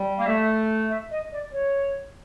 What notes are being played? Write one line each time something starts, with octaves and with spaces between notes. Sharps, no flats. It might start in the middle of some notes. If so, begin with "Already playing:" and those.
Already playing: G3
A#3 F5
A3 E5
E5
D#5
D5
C#5